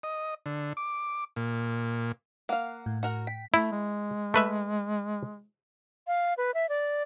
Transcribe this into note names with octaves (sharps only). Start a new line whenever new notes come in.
D#5
D3
D6
A#2
A#3 F5 F#5
A2
F#4 A#4 F#5
G5 B6
A3 E4
G#3
A3 B4 E5
F5
B4
E5
D5